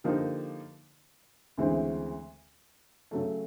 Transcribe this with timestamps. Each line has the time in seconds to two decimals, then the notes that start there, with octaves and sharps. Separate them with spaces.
0.04 D3 F3 A#3 D#4 G4
1.58 D2 C#3 E3 G#3 C4
3.11 C#3 F#3 A3